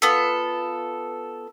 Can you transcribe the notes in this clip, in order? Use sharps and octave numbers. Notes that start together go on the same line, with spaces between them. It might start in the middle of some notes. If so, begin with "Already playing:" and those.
B3 F4 A4